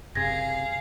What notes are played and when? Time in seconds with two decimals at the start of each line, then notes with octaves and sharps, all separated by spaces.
0.15 F#1 C3 G#4 F5 G#6 A#6